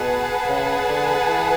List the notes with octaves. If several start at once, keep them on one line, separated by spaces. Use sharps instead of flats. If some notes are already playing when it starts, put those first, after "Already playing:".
Already playing: B2 G#4 B4 F#5 A5
C#3
D3
E3